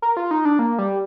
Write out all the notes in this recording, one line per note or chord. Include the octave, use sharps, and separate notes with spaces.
A#4
F4
D#4
D4
A#3
G3